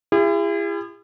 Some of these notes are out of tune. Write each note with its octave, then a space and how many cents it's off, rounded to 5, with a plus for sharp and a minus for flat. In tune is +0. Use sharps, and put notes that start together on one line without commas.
E4 +40 G#4 -40